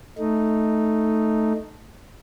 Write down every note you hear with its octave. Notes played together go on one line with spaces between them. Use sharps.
A3 D#4